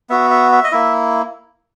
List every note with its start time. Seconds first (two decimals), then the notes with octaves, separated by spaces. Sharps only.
0.10 B3 F#4 E5
0.31 E5
0.52 E5
0.64 D#5
0.72 A#3 E4 E5